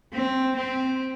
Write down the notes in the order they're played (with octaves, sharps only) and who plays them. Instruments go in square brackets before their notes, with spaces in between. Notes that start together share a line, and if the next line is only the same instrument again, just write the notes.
[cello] C4
C4